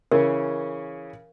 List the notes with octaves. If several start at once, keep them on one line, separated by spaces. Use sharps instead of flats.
C#3 E3 C#4 A#4